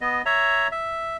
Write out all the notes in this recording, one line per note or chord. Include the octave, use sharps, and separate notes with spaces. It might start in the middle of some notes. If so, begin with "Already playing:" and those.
B3 D#5
C#5 E5 A#5
E5